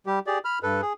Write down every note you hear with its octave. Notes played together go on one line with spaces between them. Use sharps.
G3 G4
G4 G#4 D5
B5 F6
G2 A4 B4
G#4